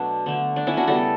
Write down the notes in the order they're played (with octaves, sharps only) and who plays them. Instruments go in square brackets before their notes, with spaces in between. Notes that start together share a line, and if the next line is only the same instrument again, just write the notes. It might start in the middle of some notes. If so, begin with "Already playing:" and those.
Already playing: [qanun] B2 F#3 A3 D4
D3 A3
D4
C#4 E4
D4 F#4
C#3 G3 B3 F#4 A4